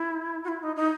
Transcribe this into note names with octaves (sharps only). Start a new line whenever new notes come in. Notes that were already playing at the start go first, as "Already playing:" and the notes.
Already playing: E4
F#4
E4
D#4
D#4